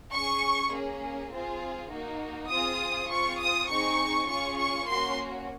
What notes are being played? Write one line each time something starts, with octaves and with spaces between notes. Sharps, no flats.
C#4 G#4 C#6
A#3 C#4 G#4
C4 F4 G#4
A#3 D#4 F#4
C4 F4 G#4 D#6
C4 F4 G#4 C#6
D#6
C4 D#4 G#4 C#6
C#4 F4 G#4 C#6
C#6
A#3 C#4 F#4 C6